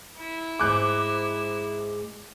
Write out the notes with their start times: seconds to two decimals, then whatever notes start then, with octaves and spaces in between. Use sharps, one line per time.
0.19 E4
0.60 G#2 G#3 C4 D6 F#6